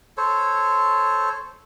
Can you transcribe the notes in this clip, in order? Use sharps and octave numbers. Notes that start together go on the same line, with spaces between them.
A4 C5 C#5